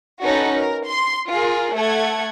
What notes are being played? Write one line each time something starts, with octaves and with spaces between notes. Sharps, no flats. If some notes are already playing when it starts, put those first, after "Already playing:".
C#4 D#4 F#4 A4 B4
A#4
C6
F4 G#4 A#4
A3 A4 F#5 G#6